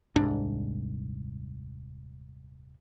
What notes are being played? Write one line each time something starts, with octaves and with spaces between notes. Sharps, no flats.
D#1 C2 G#2 D4